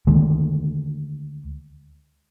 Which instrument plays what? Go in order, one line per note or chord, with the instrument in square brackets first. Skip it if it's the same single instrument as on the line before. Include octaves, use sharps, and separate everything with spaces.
[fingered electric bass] D2 D#3 G#3 A#3